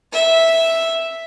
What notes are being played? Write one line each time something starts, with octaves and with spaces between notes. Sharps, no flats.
E5